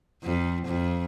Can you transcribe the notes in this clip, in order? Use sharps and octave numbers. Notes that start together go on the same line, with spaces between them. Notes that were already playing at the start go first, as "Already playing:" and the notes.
F2
F2